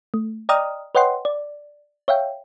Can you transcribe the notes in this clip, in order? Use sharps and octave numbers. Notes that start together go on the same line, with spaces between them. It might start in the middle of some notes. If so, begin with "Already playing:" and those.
A3
D5 D#5 G5 A#5 D#6 F6
B4 C#5 D#5 F#5 G5 C6
D5
C#5 E5 F5 G5